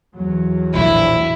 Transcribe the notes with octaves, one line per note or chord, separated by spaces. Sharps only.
E2 F#3
A#1 A2 E4